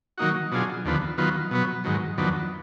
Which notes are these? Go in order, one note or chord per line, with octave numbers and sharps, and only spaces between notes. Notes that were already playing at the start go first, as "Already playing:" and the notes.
D#3 F#3 A#3 D#4 F#4
B2 F#3 D4 F4 G#4
D#2 D3 F3 B3
D#3 F#3 B3 F4
B2 F#3 B3
G#2 D#3 F#3
F2 D#3 F#3 B3 D4